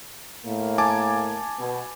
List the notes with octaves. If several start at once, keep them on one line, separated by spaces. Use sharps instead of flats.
A2 A#3
G#5 A5 D6
B2